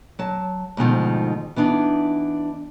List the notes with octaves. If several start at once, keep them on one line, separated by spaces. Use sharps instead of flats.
F#3 A5
D2 G#2 B2 D#3 F3
E3 B3 D4 D#4